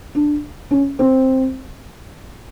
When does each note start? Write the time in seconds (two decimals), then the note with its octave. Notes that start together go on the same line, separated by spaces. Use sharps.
0.15 D4
0.71 C#4
0.99 C4